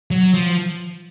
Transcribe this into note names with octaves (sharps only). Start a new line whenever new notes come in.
F#3
F3